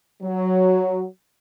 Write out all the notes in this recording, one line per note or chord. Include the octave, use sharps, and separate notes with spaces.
F#3